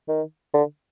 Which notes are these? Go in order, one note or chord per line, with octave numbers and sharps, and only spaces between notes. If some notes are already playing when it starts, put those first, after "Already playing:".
D#3
D3